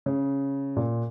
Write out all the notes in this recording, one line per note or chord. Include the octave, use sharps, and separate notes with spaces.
C#3
A#2